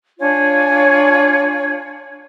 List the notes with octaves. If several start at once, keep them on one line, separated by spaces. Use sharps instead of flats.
D4 F4 C#5 G#5